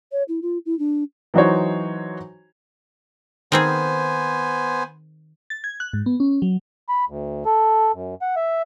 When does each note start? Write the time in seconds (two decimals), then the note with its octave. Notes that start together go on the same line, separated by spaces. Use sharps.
0.12 C#5
0.28 E4
0.42 F4
0.66 E4
0.79 D4
1.34 E3 F#3 D#4 F#4 C5 C#5
3.52 D#3 B3 C4 G#4 C5 G#5
5.50 A6
5.64 G#6
5.80 F#6
5.93 G#2
6.06 B3
6.20 C#4
6.42 F#3
6.89 B5
7.08 D2
7.45 A4
7.94 F#2
8.22 F#5
8.36 E5